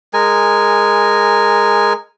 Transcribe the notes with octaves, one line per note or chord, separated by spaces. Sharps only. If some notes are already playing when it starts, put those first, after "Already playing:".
G#3 A#4 G#5